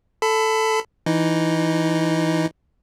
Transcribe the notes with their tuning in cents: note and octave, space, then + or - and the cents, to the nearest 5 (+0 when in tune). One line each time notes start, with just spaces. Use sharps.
A4 +0 B5 +25
E3 +0 D#4 +0